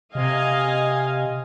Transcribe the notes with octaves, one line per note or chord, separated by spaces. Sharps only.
C3 D#5 F5 G#5